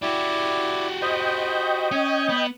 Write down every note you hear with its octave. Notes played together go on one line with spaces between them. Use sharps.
E4 F#4 G4 D5
C5 D#5 G5 B5
C#4 C#5
B3